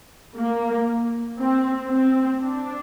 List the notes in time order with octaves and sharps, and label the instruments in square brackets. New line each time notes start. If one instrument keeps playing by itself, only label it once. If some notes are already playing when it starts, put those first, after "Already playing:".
[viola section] A#3
C4
C4
D4